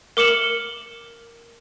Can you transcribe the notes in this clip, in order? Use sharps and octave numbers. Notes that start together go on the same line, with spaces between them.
A#4 D6 C#7 E7 F#7